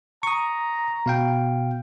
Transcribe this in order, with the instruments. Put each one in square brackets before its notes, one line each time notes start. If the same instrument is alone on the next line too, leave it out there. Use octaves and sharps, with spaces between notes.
[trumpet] A#5 [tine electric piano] C#6 D#6
[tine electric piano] B2 F5 G5